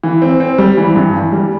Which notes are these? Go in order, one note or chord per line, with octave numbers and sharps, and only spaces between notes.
E3
C4
C4
G3
E3
G2
E3
G3